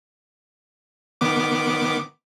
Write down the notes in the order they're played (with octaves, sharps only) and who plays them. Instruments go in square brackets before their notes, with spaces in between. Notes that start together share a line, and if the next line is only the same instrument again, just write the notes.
[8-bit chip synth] D#3 B3 D6